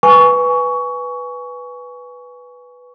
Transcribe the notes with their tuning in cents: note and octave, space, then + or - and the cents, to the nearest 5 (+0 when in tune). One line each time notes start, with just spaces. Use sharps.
B4 -5 G#5 -5 C#6 +20